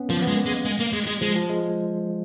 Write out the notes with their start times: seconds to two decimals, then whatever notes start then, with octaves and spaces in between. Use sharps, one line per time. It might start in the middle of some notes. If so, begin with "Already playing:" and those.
Already playing: B3 C#4
0.09 F3 A#3
0.22 B3
0.27 G#3
0.35 A#3
0.46 G#3
0.65 G#3
0.80 A#3
0.93 G#3
1.07 G#3
1.21 F3 G#3
1.36 F3
1.49 G#3